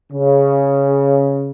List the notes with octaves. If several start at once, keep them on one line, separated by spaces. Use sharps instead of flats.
C#3